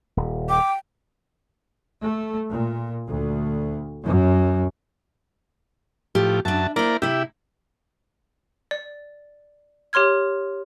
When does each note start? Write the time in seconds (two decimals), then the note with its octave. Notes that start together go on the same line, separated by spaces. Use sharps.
0.17 D#1
0.49 G5 D6
2.02 A3
2.49 A#2
3.09 D2
4.07 F#2
6.15 A2 F3 G4
6.45 F#2 D4 E5 A5
6.76 A#3 E4 A#4 C5 D5
7.02 C3 E4 G4 E5
8.71 D5
9.93 G4 C#5 C6 F6 G#6